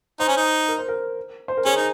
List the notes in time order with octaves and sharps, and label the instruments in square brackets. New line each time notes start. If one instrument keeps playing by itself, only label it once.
[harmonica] D#4 [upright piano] C5
[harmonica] C#4
D#4
[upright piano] A#4
C5
A#4
C5
A#4
[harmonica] C#4 [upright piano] G#4
[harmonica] D#4